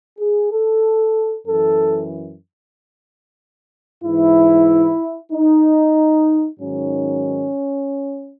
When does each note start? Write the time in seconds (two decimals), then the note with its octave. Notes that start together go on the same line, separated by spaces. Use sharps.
0.19 G#4
0.51 A4
1.46 F#2 E3 A4
4.03 G#2 E3 E4
5.32 D#4
6.59 G#2 D#3 F#3 C#4